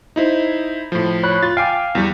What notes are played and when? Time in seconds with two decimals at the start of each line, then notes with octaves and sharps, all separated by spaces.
0.16 D#4 E4 C5
0.92 A2 F3
1.23 C#5 B5 F#6
1.43 F4 A6
1.57 F5 G5 G#5 D6
1.95 E2 G3